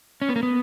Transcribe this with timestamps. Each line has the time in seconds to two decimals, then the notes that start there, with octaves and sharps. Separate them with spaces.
0.22 C#4
0.29 B3
0.36 A#3
0.43 B3